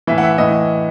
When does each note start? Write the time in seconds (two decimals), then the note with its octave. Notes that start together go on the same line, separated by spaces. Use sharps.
0.07 A2 E3 E5
0.18 F#5
0.23 E5
0.38 A2 E3 D#5